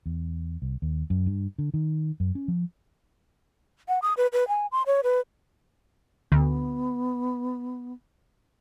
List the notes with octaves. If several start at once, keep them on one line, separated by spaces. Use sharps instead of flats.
E2
C2
D#2
F#2
G2
D3
D#3
F#2
C#4
F3
F#5
D#6
B4
B4
G#5
C6
C#5
B4
D2 B3